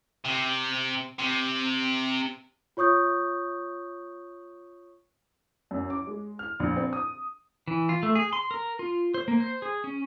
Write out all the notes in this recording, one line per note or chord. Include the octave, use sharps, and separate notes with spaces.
C3
C3
F4 C#5 C#6 D#6 G6
F#2
D6
G#3
F6
A#1
C4
D#6
E3
F4
A3
G#4
C6
A#4
F4
C5
A#3
C5
G#4
C#4